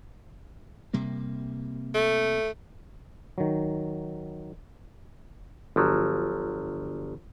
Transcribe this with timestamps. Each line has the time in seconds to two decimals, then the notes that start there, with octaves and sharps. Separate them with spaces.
0.93 C3 G3 A#3
1.95 A3
3.38 D#3 F#3
5.76 G1 F3 F#3